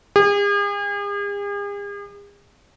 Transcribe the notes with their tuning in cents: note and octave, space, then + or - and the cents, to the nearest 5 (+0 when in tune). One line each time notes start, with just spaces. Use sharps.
G#4 -45